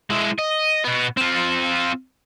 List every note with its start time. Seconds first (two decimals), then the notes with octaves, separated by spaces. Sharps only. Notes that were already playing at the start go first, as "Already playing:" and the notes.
0.10 G#3 E4
0.39 D#5
0.84 B2 B3
1.17 C4 F4